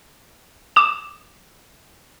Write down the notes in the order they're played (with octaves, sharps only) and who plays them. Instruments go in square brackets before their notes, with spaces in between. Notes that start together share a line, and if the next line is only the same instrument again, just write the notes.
[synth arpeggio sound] D6 E7